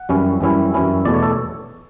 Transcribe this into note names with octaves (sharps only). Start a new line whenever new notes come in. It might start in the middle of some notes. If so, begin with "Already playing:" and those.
Already playing: F#5
F#2 E3 G3 C#4 E4
F#2 E3 G3 C#4 E4
F#2 E3 G3 C#4 E4
E2 B2 A3 D5
C#5
A4